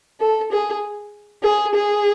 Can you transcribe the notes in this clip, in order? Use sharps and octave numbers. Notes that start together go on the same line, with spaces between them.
A4
G#4
G#4
G#4